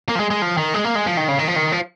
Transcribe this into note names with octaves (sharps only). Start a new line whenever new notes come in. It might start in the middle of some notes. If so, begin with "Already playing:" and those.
A#3
F3
G#3
G#3
F3
D#3
G#3
A#3
G#3
F3
D#3
C#3
D#3
F3
D#3
F3